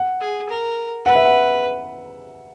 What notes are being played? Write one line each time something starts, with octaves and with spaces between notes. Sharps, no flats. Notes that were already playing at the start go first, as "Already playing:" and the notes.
Already playing: F#5
G#4
A#4
B4 F#5
E5
F#5